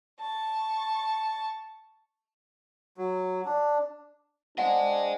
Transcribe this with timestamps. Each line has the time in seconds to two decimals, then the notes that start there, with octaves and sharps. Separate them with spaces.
0.20 A5 C#6
2.97 F#3
3.45 D4
4.58 C4 D4 D#5 F#5 G#5